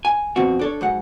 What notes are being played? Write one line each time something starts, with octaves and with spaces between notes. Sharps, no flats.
G#5
F2 B2 C4 F#4
D4 A4 C#5
G#2 F#3 F#5